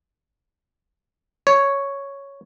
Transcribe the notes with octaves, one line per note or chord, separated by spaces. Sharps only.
C#5